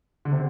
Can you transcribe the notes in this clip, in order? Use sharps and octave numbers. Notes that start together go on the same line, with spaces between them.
D3
C3